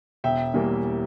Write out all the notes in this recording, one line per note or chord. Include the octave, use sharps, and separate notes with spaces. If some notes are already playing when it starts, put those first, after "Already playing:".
E1 E5 G5
E2 E3 G3 A#3